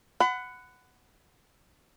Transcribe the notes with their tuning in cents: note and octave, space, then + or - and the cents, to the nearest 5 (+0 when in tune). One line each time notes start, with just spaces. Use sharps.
F#5 +0 B5 +30